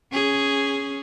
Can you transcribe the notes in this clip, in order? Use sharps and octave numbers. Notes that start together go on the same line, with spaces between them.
C#4 G#4